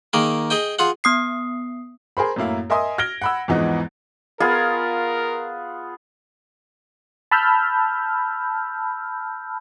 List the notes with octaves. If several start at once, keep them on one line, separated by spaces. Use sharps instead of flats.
D#3 A#3 G#4
G#4 D#5 G5
F4 G#4 F#5
B3 D#6 C7
G#4 A#4 C5 B5
F#2 A2 A#3 E4 F5
A#4 D#5 E5 G#5 C6 D#6
F6 G#6 A#6 D7 G7
F#5 B5 E6
E2 G#2 E3 F3 B3 D#5
B3 F4 G#4 A#4
A5 B5 E6 F6 G6